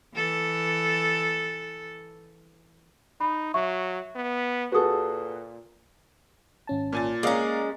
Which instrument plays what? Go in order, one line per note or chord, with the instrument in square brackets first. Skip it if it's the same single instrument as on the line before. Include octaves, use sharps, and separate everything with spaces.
[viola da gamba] E3 A4
[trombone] D#4 [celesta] B5
[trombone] F#3 [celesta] E5 C#6
[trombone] B3
[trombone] A#2 [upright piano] F#4 G#4 A4 [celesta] B4 D#6
[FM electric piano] G#1 C#4 A5
[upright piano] A#2 G#5 A6
[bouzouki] G#3 C#4 [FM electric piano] A#3 [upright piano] D5 F5 A#5